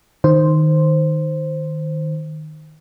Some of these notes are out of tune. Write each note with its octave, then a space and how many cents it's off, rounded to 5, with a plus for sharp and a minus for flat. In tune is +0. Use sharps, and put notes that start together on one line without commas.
D#3 -5 C5 +0